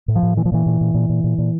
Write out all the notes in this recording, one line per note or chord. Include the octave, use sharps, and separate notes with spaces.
A2
F3
A2
A#2 E3
F3
A#2 E3
A#2
A#2
A#2
A#2
A#2
A#2